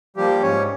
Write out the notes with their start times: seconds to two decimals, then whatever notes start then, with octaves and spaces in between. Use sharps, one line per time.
0.16 F3 G3 A#3 G4
0.42 G#2 C#4 C#5